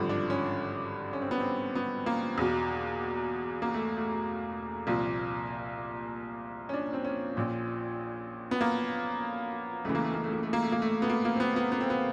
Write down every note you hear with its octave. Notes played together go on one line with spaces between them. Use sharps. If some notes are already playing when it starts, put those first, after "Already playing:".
Already playing: G#1 G2 D3 F3
D4
C#4
C#4
C4
B3
C4
B3
A#3
E2 B2
A#3
A3
A3
C2 A#2 F3 A#3
C#4
D4
C4
C#4
A#1 A#2 F3
B3
A#3
C#2 C#3 E3 A3
A#3
A3
A#3
A3
A#3
A3
A#3
A3
A#3
A3
B3
A#3
A#3
C4
B3
B3
B3
C4
B3